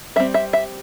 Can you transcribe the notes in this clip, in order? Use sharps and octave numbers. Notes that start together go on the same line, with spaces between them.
G3 C4 E5
E5
E5